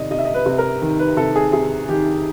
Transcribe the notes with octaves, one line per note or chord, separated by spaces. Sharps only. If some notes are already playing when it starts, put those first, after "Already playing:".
Already playing: C3 D#3 D5 D#5
C3 D#5
E5
D#5
B4
C3
A#4
D#3
B4
C3 A4
G#4
C3 G#4
D#3 G4